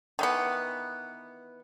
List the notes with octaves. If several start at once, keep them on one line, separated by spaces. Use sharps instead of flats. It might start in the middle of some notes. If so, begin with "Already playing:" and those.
D#3 E3 B3